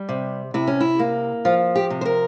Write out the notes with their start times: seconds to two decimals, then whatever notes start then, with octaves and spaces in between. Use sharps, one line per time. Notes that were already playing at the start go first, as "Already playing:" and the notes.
Already playing: G3
0.09 C3
0.54 C3 E4
0.67 C#4
0.80 E4
0.99 A#3
1.45 F3 F4
1.75 G4
1.90 C3
2.01 C5
2.05 A#4